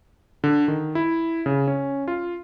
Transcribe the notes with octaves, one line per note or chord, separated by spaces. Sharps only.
D3
D#3
E4
C#3
C#4
F4